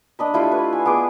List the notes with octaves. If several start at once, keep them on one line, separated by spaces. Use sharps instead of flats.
D4 D#5 B5
A3 E4 F4 G4
B4
G#5
B3 G#4 D6